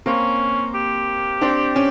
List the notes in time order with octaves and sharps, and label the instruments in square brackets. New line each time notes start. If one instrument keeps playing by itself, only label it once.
[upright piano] A#3 C4 [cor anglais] C#4
[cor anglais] G4
[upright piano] C4 D4
C#4